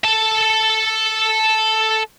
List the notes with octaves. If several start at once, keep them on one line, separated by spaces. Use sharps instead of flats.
A4 A5